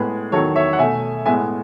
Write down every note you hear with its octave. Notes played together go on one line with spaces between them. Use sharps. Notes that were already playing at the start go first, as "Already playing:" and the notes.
Already playing: A2 G#3 B3 G#4 B4
E2 D#3 F#3 A4 C#5
C#5 E5
F#5
B2 A3 E5 G#5
A2 G#3 B3 E5 G#5